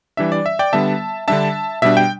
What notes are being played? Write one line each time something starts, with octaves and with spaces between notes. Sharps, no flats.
E3 G3 D4 E5
D5
E5
D5 G5
D3 G3 B3 E5 A5
D3 G3 D4 E5 A5
B2 G3 D4 E5
G5